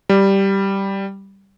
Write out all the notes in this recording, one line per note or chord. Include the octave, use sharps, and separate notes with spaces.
G3